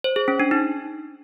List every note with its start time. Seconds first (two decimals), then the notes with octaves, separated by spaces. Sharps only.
0.04 C5
0.16 G#4
0.28 C#4
0.40 D4
0.51 D#4